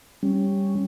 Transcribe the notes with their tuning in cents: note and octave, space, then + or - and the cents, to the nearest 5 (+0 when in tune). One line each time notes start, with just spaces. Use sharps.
G3 +0 C#4 +0